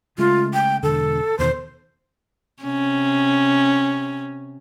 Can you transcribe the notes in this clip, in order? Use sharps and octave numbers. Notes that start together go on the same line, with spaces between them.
C#3 G#3 A3 F4
G5
E1 D3 A4
E2 B2 D#3 C5
C3 C#4